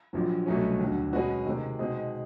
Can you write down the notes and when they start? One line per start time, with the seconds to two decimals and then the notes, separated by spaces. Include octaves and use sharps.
0.13 A#1 A#2 F#3
0.46 C2 B2 F#3 A3 C#4
0.79 D#2 D3 F#3
1.13 B2 G#3 C#4 F#4 B4
1.46 C3 D#3 G#3
1.79 B2 G#3 C4 D#4